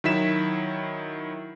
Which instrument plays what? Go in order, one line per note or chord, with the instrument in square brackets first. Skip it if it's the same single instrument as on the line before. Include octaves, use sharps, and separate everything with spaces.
[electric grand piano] D#3 F#3 E4 B6 E7